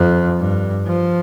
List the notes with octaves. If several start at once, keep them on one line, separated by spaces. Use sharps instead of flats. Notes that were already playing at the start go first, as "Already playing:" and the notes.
Already playing: F2
G2
F3